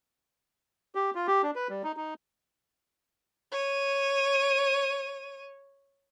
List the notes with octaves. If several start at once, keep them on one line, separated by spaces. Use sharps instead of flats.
G4
F4
G4
D4
B4
G3
D#4
D#4
C#5 D#7